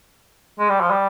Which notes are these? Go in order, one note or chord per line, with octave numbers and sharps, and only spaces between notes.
G#3
G3
F3
G3